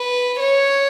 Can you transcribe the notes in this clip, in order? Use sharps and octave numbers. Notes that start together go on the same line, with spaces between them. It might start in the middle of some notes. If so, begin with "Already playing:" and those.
Already playing: B4
C#5